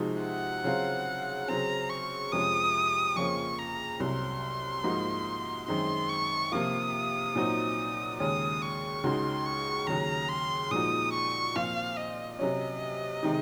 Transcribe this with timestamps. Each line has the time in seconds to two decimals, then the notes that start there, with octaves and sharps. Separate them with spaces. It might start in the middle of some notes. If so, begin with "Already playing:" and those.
Already playing: C3 F3 G#3 D#4 F#4
0.22 F#5
0.64 C#3 F#3 C4 F4
1.48 C#3 F#3 C4 A#5
1.90 C#6
2.32 F2 C3 F3 G#3 C#4 D#6
3.16 F2 C#3 F3 A#3 C#4 C#6
3.59 A#5
4.00 C2 C3 F#3 C6
4.84 G#2 F3 A#3 D#4 F#4
5.67 F#2 D#3 G#3 C4 D#4 C6
6.09 C#6
6.52 C3 F3 A#3 F4 D#6
7.35 A#2 F#3 C4 D#4 F#4
8.20 D#2 C#3 G#3 C#4 D#6
8.62 C#6
9.03 C#2 C#3 G#3 D#4 F#4 C6
9.46 C#6
9.87 D#2 C#3 F#3 A#5
10.29 C6
10.71 A#2 F3 G#3 D#4 F#4 D#6
11.13 C#6
11.55 A#2 F3 C4 F4 F5
11.97 D#5
12.39 C3 F#3 C#4 D#5
13.23 C3 D#3 G#3 D#4